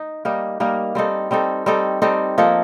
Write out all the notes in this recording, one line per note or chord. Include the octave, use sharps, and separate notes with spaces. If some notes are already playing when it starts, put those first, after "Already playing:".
Already playing: D#4
G3 A#3 D#4 A#4
G3 A#3 D#4 A#4
G3 C4 D#4 A4
G3 C4 D#4 A4
G3 C4 D#4 A4
G3 C4 D#4 A4
F3 A#3 D#4 A4